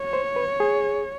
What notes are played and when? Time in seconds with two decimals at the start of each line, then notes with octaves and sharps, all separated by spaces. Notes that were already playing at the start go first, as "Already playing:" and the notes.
Already playing: C#5
0.13 C5
0.36 B4
0.60 G#4